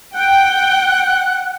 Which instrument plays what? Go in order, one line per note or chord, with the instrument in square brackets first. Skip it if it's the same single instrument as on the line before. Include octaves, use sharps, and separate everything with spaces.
[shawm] F#5 [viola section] G5